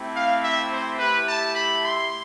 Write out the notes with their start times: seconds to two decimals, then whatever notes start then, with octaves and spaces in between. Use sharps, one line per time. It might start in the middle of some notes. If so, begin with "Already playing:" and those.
Already playing: A3 C4 E4 G4
0.14 F5
0.42 E5
0.70 C5
0.98 A3 E4 G4 B4
1.26 A5
1.54 B5
1.82 C6